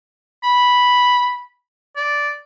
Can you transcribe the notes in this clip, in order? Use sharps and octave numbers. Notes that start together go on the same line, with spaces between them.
B5
D5